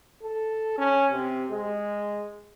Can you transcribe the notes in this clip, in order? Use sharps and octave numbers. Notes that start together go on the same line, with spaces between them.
A4
C#4
C3
G#3